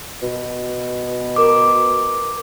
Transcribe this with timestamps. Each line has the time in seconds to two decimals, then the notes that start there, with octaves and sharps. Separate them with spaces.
0.23 B2
1.36 A#4 D6